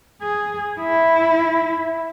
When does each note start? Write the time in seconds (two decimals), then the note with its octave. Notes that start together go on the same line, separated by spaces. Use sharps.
0.22 G#4
0.80 E4